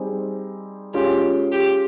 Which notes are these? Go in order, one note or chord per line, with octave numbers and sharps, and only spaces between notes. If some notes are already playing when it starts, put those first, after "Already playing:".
Already playing: G3 C4 D#4 G#4
G#3 C#4 F4 G4 G#4
G4